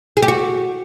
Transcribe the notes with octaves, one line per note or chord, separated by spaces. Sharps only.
G#4
G4
F#4